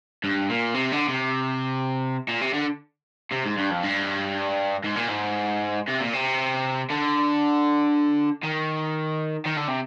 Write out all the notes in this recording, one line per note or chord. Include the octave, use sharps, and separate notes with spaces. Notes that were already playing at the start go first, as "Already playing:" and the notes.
G2
A#2
C3
D3
C3
A#2
C3
D3
C3
G#2
G2
F2
G2
G#2
A#2
G#2
C3
A#2
C3
D3
D#3
D#3
D3
C3